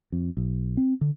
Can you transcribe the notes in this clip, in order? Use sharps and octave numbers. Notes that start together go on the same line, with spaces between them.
F2
B1
C4
D3